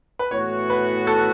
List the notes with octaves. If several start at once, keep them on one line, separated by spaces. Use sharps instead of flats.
B4
A2 E3 B3 F#4 C#5
B4
A4